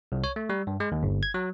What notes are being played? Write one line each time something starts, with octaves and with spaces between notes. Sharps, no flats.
C2
C#5
A3
G3
G2
G#3
D#2
G1
G#6
F#3